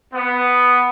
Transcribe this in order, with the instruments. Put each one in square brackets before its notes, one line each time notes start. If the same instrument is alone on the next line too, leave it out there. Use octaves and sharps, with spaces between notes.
[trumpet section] B3